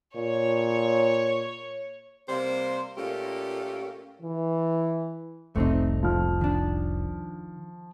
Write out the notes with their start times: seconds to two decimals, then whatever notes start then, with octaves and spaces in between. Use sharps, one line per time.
0.15 A#2 C#5
2.29 C3 G3 A#3 C5
2.97 A#2 A3 A#3 C#4 G4
4.22 E3
5.56 F1 C2 F2 A3 C4 D#4
6.03 F3 F6
6.41 D#3 D4